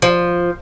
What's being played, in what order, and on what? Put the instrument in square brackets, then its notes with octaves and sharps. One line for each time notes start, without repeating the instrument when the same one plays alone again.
[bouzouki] F3